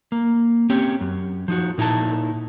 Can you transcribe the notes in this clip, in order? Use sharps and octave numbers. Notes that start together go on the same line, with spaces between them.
A#3
C4 C#4 G4 C#5
F#2
F3 D#4 F#4
A#2 D#4 E4 G#5 A5